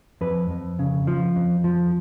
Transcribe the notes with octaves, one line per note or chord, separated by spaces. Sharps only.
F2 B4
F2
C#3
F3
F2
F3